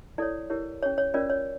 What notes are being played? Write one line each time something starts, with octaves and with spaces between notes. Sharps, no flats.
E4 A4 C#5 D5
E4 G4 A#4 C#5
C#4 G4 C#5
C#5
C#4 F4 A#4 C#5 D5
C#5